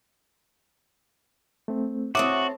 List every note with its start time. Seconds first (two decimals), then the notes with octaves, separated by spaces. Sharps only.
1.68 A3 C4
2.15 C4 F#4 A4 C#5 E5 D6 D#6